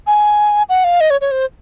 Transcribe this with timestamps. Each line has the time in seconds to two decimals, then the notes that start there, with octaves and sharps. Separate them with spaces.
0.07 G#5
0.69 F#5
0.84 F5
1.01 D#5
1.10 C#5
1.21 C#5
1.31 C5